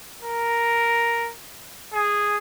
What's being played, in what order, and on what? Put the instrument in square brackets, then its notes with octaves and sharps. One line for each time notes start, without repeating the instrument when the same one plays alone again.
[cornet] A#4
G#4